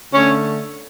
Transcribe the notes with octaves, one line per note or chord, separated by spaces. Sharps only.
D3 A3 C#4 C#5